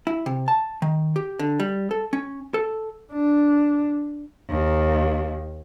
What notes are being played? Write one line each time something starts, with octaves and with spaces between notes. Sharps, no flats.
E4
C3
A5
D#3
G4
D3
G3
A4
C#4
A4
D4
D#2